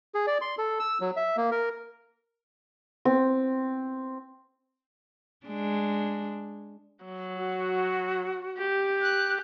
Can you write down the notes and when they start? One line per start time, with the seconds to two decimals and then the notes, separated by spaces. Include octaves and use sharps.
0.14 G#4
0.27 D5
0.41 C6
0.58 A4
0.80 E6
1.01 F#3
1.16 E5
1.37 A#3
1.51 A#4
3.05 C4
5.46 G#3 D4
7.04 F#3
7.37 F#4
8.58 G4
9.02 F#6